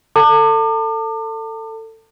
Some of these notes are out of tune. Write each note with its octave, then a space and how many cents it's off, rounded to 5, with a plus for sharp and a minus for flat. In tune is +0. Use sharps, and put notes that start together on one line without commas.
A4 +20 A5 +40 D6 +35